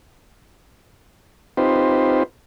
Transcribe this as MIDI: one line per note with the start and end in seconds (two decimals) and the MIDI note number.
1.57 2.23 60
1.57 2.23 63
1.57 2.23 65
1.57 2.23 67
1.57 2.23 71
1.57 2.23 72